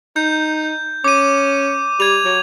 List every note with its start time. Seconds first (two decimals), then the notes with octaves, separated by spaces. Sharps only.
0.16 D#4 G6
1.04 C#4 D6 D#7
2.00 G3 G#6 F7
2.25 F#3